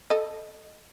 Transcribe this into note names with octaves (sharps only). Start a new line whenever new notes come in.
A4 D#5